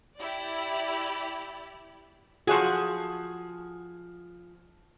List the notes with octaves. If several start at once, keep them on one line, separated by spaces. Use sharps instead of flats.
E4 G4 D5
F3 F#4 G#4 F#5